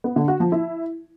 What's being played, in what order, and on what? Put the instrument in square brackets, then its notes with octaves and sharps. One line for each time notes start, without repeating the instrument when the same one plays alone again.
[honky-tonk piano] B3
D3
F#4
F3
E4